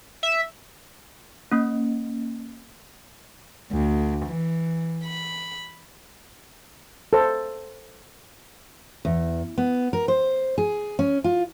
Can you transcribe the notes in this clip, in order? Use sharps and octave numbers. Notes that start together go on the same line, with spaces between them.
E5
A#3 C#4
D2
E3
B5
A4 C5
E2
B3
A#4
C5
G#4
C#4
F4